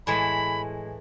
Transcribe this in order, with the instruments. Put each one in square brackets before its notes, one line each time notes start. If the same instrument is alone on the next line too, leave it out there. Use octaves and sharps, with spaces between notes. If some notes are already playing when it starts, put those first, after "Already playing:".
[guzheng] A2 E3 G#3 [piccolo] B5